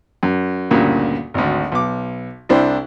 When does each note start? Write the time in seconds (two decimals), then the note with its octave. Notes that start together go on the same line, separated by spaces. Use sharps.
0.23 F#2
0.71 D2 G2 A#2 C#3
1.34 G#1 D2
1.72 B1 D6
2.49 C2 D4 E4 C5 G5